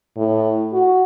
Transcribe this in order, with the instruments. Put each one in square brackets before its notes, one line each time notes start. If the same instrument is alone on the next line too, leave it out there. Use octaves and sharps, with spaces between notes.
[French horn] A2
F#4